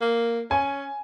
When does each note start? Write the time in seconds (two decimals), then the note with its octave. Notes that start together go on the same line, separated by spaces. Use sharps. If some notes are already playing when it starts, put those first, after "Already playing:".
0.01 A#3
0.51 C#4 G#5